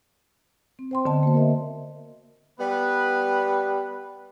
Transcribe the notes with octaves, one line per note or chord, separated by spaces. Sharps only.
C4
C5 G5 C6
D3 B3 D#5 A5
A#3 F#4 C5
A#4 D#5 E5
G3 B3 B4